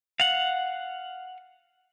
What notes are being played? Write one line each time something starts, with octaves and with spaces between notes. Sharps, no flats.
F5 F#5